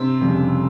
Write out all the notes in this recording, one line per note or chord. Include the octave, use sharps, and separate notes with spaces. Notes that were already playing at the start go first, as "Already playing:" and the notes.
Already playing: C3 C4
F1 F2 C#3 G3